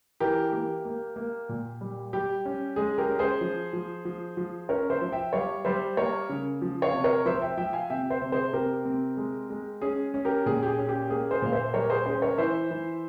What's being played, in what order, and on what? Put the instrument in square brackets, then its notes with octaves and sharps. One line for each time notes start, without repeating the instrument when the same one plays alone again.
[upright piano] E3 G4 A#4
A#3 G4
A#3
A#3
A#2
G3
G3 G4
C#4
G#3 G#4
G4 A#4
C#4
G#4 C5
F3
F3
F3
F3
C#4 A#4 C#5
C5 E5
F3
E5 G5
G3 C#5 F5
G3 C5 E5
A#3 A#4 C#5
C#3
F3
C#5 F5
C3
A#4 C#5
F3 C5 E5
E5 G5
F3 E5 G5
F5 G#5
C3 E5 G5
C5 E5
C3
G#4 C5
C3 G4 A#4
C4
G#3
G#3
C#4 G#4
C#4
G4 A#4
A#2 G#4
G4
G#4
C#4
G4
A#3 G#4
G#4 C5
A#2 F5
C5 E5
G3 A#4 C#5
G#4 C5
C#4 G#4 C5
A#4 C#5
E3 C5 E5
E3